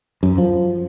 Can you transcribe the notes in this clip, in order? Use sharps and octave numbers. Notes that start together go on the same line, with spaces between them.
F#2
F3